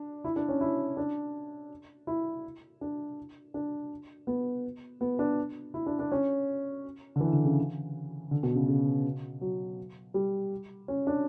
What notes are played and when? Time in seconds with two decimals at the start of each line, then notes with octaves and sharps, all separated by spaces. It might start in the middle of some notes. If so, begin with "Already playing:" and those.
Already playing: D4
0.24 E4
0.36 D4
0.49 C#4
0.61 E4
0.97 D4
2.07 E4
2.81 D4
3.54 D4
4.27 B3
5.01 B3
5.19 D4
5.74 E4
5.86 D4
5.99 D4
6.12 C#4
7.16 D3
7.21 E3
7.33 D3
7.45 C#3
8.31 D3
8.43 B2
8.55 C#3
8.68 C#3
9.41 F#3
10.14 G3
10.88 C#4
11.07 D4